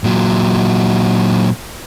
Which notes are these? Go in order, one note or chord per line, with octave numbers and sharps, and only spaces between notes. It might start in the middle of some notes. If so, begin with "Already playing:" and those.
A#2 F#3